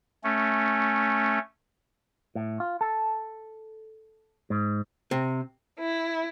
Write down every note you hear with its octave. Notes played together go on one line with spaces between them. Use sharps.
A3 C#4
A2
F4
A4
G#2
C3
E4